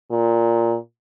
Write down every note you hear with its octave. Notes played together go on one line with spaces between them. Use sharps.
A#2